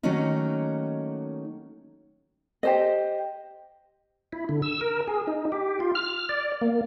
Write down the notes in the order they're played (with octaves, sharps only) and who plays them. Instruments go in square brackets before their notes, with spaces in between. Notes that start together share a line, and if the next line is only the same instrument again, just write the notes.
[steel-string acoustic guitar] D#3 F#3 A3 A#3 C#4 D#4
[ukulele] G4 C5 D#5
[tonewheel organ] E4
D3
E6
A#4
G#4
D#4
G4
F4
F6
D5
A#3